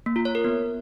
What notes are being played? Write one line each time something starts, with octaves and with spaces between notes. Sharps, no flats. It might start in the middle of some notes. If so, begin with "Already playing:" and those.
A#3
F4
C#5
A#4
B3